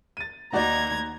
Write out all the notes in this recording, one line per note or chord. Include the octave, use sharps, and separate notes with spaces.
A6 D#7
D#2 D#4 F#4 D5 A#5 G#6